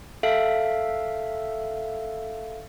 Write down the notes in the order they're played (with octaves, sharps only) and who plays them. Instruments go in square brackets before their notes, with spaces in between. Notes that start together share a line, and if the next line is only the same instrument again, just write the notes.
[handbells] A4 E5 F5